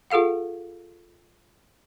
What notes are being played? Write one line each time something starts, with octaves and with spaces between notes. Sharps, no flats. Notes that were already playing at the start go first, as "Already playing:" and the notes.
F4 G#4 A4 F5 F#5